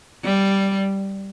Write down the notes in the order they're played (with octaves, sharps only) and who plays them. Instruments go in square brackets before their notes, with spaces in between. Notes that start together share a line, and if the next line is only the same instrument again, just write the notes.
[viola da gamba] G3